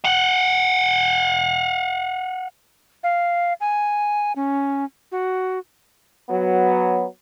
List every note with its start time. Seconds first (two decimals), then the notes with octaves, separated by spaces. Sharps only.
0.04 F5 F#5
3.03 F5
3.60 G#5
4.36 C#4
5.12 F#4
6.30 F#3 B3